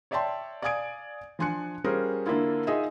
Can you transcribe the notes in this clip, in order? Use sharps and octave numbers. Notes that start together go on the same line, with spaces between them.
C#5 D5 E5 G5 A5 C6
D5 F5 G#5 D#6 G#6 D7
F3 D4 G#5 C6 F#6 C#7
G3 C#4 F4 G#4 A#4 C5
D3 A#3 D4 E4 F4
D#4 F4 G#4 D#5 E5